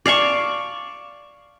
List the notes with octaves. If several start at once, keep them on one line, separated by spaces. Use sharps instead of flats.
D5 F5 A5 C#6